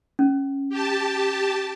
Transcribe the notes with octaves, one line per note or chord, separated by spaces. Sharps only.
C#4
G4 A5